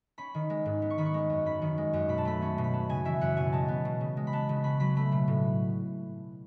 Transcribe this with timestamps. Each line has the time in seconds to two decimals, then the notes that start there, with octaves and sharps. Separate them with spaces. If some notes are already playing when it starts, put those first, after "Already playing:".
0.18 C#4 B5
0.35 D#3
0.50 G#3
0.66 G#2
0.82 B3
0.90 C#6
0.98 D#3 B5
1.06 C#6
1.14 G#3
1.30 F#2
1.46 C#4 B5
1.62 D#3
1.78 G#3
1.93 F#2
2.09 B2 B5
2.18 A5
2.25 A3 B5
2.42 C#4
2.58 B2
2.64 B5
2.73 B3 A5
2.89 C#3 G#5
3.05 E3 E5
3.21 F#2 F#5
3.37 B2 G#5
3.53 G#3 A5
3.68 B3
3.85 B2
4.01 C#3
4.17 G#3
4.27 B5
4.33 B3 A5
4.49 C#3
4.64 C#4 B5
4.80 F#3 B5
4.96 A3 B5
5.12 B2
5.28 A2